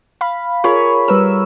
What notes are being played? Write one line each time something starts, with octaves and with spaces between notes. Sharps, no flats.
F5 B5
F4 G#4 A#4 C#5 B5
G3 A#4 B4 E6